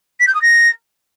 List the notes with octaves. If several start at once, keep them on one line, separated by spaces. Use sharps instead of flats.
B6
G6
D#6
A#6